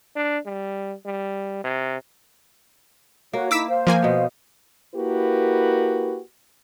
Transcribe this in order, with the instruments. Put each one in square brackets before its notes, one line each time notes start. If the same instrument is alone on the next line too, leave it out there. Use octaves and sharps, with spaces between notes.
[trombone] D4
G3
G3
C3
[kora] A#3 [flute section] F#4 C#5
[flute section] D#4 E4 [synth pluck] D6 E6 B6
[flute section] C5 F5
[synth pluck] F3 A#3 G#5
[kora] B2 B3
[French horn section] A#3 E4 F#4 G4 A#4 B4